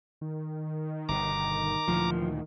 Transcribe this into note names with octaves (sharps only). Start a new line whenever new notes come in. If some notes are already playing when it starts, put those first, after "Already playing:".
D#3
G1 B2 A#5 D6
D2 A#2 E3 F3